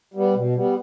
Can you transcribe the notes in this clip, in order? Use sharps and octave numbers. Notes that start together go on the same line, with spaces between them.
G3 B3
B2
G3 B3